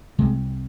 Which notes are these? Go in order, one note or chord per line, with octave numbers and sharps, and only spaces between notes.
C2 C3 G#3